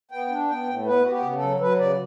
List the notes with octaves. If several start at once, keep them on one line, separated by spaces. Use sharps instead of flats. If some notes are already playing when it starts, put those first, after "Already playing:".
B3 G5
D4
B3 G5
A2
B3 B4
B3 F#4
G4
C#3
A4
F#3
F#3 B4
C#3 D5